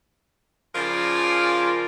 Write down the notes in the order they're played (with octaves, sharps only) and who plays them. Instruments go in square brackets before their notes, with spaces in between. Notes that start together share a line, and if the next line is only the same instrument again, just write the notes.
[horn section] C#3 F3 F4 A#4 D5 G#5